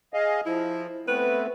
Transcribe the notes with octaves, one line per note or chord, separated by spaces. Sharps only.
G#4 D#5 F5
F3 E4
A3 B3 C4 B4